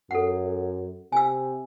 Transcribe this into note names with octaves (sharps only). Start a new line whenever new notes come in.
F#2 A4 F#5
C3 G#5 E6